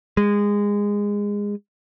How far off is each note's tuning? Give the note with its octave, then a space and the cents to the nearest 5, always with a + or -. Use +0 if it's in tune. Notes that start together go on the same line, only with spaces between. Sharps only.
G#3 -20